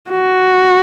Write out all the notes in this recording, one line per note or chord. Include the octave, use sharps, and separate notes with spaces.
F#4